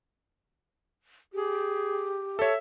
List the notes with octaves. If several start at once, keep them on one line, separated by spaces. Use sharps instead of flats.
G4 G#4
A4 C#5 E5